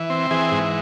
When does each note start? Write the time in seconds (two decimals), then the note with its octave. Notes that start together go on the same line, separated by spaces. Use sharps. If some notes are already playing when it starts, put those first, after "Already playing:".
Already playing: E3
0.10 C4
0.31 E3 G#4
0.51 G#2